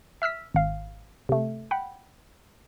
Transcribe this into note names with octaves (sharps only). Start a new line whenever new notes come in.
E5 E6 F6 B6
G#1 F5
C3 A3
F#5 G5 B5